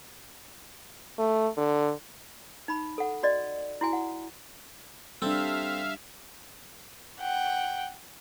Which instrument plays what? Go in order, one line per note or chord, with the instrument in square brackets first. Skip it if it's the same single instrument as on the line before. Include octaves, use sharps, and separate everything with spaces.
[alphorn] A3
D3
[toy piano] D#4 B5
A4 F#5
F#4 D5 D#5
E4 F#4 G#5
F#5
[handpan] G3 D4 [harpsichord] C4 A4 [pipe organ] E5 F5
[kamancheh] F#5 G5